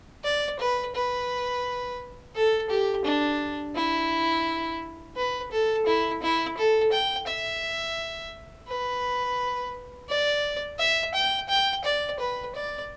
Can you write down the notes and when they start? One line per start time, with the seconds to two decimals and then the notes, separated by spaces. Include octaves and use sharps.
0.24 D5
0.59 B4
0.95 B4
2.35 A4
2.70 G4
3.05 D4
3.76 E4
5.16 B4
5.52 A4
5.87 E4
6.22 E4
6.57 A4
6.92 G5
7.27 E5
8.68 B4
10.09 D5
10.79 E5
11.15 G5
11.49 G5
11.85 D5
12.20 B4
12.55 D5